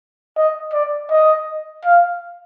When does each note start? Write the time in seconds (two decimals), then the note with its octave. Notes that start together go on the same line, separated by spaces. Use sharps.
0.37 D#5
0.74 D5
1.11 D#5
1.85 F5